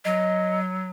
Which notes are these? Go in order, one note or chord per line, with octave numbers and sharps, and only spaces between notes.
F#3 D#5